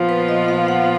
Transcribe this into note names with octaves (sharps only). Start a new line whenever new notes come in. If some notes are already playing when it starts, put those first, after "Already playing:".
Already playing: A#2 F3 B3 F4
B4
D#5
F5
F#5